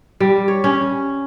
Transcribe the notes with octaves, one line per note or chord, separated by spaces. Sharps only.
G3
C#5
C#4